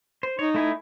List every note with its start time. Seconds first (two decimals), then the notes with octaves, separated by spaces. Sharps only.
0.23 C5
0.39 D#4 C#5
0.54 A3 E4 G#5